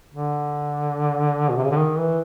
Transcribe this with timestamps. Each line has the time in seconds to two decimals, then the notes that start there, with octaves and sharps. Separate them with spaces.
0.14 D3
1.49 B2
1.56 C3
1.64 C#3
1.71 D3
1.77 D#3
1.98 E3